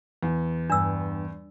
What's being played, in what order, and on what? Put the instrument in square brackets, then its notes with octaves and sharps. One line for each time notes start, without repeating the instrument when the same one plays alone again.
[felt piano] E2
[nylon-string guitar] G2 [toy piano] D4 E6